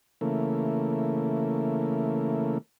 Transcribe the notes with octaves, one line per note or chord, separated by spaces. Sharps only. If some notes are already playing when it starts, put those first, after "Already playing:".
C#3 E3 A3 A#3